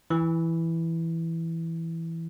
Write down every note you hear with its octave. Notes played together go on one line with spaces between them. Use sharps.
E3